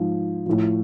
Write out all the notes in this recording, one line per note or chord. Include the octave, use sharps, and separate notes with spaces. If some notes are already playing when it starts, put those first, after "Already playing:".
Already playing: G#2 F3
A2 F3